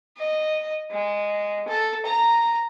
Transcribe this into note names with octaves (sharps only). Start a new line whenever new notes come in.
D#5
G#3
A4
A#5